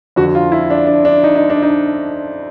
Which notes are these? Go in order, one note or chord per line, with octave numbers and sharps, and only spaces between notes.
F2 D3 F#4
F4
E4
D4
D4
D4
D#4
D#4
D4
D#4